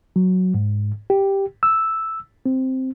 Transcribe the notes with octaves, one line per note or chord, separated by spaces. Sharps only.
F#3
G#2
G4
E6
C4